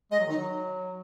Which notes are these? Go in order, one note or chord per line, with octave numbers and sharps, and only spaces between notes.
G#3 D#5
F#3
D#3
D#4
F#3